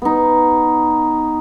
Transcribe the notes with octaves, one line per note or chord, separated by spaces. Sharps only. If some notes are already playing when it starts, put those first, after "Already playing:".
B3 D#4